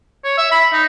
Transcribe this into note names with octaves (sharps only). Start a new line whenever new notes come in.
C#5
E5
B5
D#4